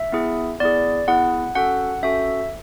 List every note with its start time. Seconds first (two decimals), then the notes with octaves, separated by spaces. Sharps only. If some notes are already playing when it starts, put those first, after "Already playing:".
Already playing: E5
0.12 B3 E4 G#4
0.60 B3 E4 G#4 D5
1.07 B3 E4 G#4 F#5
1.55 C#4 F#4 A4 F#5
2.03 C#4 F#4 A4 E5